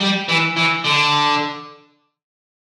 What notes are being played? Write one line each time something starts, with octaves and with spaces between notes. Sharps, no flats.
G3
E3
E3
D3